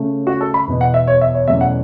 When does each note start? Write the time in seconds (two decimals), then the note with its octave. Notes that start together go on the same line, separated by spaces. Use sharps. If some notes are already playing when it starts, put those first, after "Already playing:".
Already playing: C#3 A3 C#4
0.27 F#4
0.41 A4
0.54 B5
0.67 E2 B2 B3
0.81 F#5
0.94 E5
1.08 C#5
1.21 E5
1.35 C#5
1.47 E2 B2 F#3 A3 C#4 E5
1.61 F#5